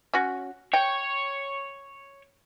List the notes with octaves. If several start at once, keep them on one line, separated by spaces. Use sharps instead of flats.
C#4 F#4
C#5 G5